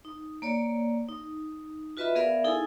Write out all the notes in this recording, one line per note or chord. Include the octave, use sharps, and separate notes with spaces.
D#4
A#3 C#5 D5
D#4
F4 F#4 B4 D#5 E5 B5
B3 G#4 A#4 D5 E5 F5
D#4 E4 G#4 A4 G#5